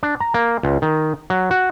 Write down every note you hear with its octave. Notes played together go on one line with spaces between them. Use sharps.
D4
A#5
A#3
C#2
D#3
F#3
F#4